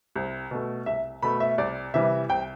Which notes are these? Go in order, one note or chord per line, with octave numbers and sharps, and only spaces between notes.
C2
B2 A3
C2 E5
B2 A3 B5
E5
C2 D5
C3 E3 G3 E5
C2 G5